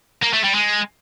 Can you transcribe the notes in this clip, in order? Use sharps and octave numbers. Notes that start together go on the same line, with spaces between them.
A#3
A3
G3
G#3